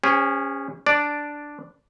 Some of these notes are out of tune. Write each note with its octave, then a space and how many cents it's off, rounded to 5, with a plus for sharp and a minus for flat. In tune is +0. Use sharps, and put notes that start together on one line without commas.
C#4 +0 G#4 -40 C5 -20
D4 +0 D5 +0